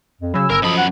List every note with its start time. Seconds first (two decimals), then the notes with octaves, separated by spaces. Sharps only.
0.20 F2
0.34 C#3 F#3 G#5 B5 E6
0.50 G1 A#4
0.62 F#2 F3 A4 D#5 B5
0.77 F#5